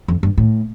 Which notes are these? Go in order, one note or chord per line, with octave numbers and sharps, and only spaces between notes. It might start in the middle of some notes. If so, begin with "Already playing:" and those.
F2
G2
A2